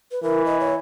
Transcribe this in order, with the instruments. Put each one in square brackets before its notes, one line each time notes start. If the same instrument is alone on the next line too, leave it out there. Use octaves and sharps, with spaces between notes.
[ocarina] B4
[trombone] E3 [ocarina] A#4
[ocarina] D#5
C#5